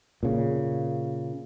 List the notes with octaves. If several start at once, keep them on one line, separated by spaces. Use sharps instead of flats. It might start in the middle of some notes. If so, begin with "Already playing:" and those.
A#2 C#3